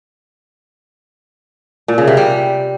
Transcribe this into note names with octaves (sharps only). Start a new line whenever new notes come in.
A#2
C#3
C3
G3